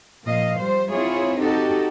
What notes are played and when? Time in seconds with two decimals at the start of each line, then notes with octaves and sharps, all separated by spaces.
0.23 A#2 F3 D#5 F5
0.59 F3 G3 C5
0.90 C4 E4 F4 G#4 C#5
1.39 D#4 F#4 G4 A4